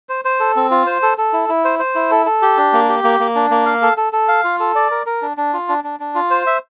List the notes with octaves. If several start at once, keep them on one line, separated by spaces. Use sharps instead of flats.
C5
C5
A4
C4
F4
C5
A4
A4
E4
E4
C5
C5
E4
A4
A4
G4
D4
A#3
G4
A#3
A#3
D4
A#3
F5
A4
A4
A4
F5
F4
A4
D5
A#4
A#4
D4
D4
F4
D4
D4
D4
F4
C5
E5